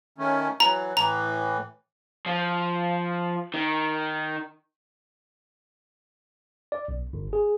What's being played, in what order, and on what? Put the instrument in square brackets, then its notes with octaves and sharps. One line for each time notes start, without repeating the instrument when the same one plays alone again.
[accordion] D#3 A3 C#4
[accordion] E3 F#3 [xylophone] A#5
[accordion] A2 E3 [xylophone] A#5
[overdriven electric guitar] F3
D#3
[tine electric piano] D5
B1
G1
G#4